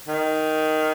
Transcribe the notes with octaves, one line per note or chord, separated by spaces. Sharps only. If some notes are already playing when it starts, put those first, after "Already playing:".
D#3